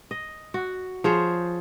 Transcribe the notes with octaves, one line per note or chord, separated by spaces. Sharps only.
D#5
F#4
F3 G#4 C5 C#5